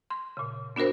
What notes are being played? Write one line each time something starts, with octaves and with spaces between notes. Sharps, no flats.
C6
A#2 C#3
B3 D4 F#4 A#4 C5